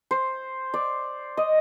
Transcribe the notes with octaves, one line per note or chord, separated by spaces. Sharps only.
C5
D5
D#5